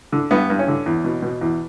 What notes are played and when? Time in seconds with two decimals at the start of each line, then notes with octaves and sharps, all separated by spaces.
0.12 D3
0.31 G2 B3
0.50 G2
0.59 C#4
0.68 D3
0.86 E2
1.04 B2
1.22 B2
1.41 E2